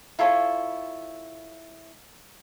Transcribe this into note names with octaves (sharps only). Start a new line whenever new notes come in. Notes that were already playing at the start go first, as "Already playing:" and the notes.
E4 F4 A4 C#5